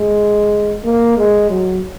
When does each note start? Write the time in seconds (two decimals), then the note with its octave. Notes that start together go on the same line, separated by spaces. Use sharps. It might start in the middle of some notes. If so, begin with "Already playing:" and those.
Already playing: G#3
0.85 A#3
1.17 G#3
1.50 F#3